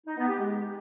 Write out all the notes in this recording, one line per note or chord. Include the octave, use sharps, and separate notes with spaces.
D#4
B3
G4
G#3